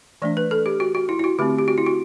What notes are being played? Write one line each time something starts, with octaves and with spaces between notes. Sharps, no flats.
E3 A3 D4 D5
B4
A4
G4
F#4
F#4
E4
E4
F#4
D3 A3 C4 G4
G4
F#4
E4
F#4